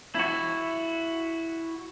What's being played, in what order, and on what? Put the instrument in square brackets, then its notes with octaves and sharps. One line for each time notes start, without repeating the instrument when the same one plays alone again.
[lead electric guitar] E4 F#4